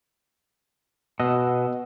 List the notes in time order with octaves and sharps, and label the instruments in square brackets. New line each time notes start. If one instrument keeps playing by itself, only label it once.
[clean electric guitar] B2 [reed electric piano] D#5 F#5 E6